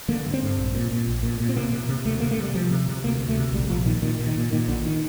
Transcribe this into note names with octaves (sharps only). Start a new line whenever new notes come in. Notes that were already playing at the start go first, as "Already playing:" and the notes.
D3 A#3
G2
C4
G2
A#1
A#2
A#2
A#1
A#2
A#2
C4
C3 A#3
C3
C3
D2 A3
C3 A#3
A3
C3 G3
C3 F3
C3
C3
D2 A#3
D2
A3
C3
A#1 G3
A#1 F3
A#2 D#3
A#2 D#3
A#2
D#3
A#2
A#2 D#3
A#1 D3
D#3